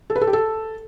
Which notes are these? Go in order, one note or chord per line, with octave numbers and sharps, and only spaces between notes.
A4
B4
A4
G4
A4